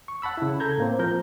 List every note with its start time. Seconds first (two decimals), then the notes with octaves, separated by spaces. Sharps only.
0.08 C#6
0.22 F#5 A5 B5 E6
0.37 C#3 E4
0.60 A4 A#5 G6 G#6
0.78 A2 A#3 C4
0.99 F3 A#4 G6